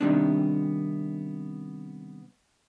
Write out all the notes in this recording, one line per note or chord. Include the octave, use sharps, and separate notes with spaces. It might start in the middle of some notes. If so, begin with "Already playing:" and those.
C3 D#3 G3 B3 D4